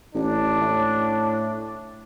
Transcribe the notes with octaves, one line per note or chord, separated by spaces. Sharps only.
A1 D4
A2